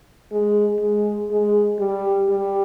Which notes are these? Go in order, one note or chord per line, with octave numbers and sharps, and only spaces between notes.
G#3
G#3
G#3
G3
G3